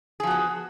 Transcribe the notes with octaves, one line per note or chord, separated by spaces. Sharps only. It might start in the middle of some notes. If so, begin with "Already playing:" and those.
F3 B3 F#4 G#4